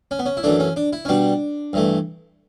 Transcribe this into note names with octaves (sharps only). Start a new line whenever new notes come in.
C#4
B3
C#4
E4
F#2 E3 A3 D4
C#4
D4
E4
C#4
B2 G3 D4
G2 E3 A3